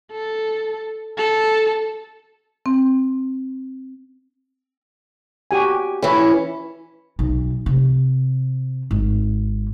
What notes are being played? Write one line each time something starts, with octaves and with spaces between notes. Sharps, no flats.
A4
A4
C4
F#4 G4 G#5
E3 C#4
B1
C3
G#1